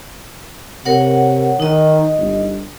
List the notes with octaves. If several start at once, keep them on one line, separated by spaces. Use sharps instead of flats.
C3 A#4 C#5 F#5
D#3 D#4 D#5
G1